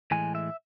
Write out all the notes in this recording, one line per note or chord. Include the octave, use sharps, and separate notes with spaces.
A2 E3 G#3 G#5
E5